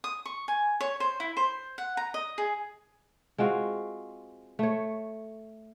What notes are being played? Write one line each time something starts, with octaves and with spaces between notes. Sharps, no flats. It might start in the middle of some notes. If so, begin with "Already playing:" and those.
D#6
C#6
G#5
C#5
C5
E4
C5
F#5
A#5
D#5
G#4
G#3 C4 F4 F#4
A3 C#5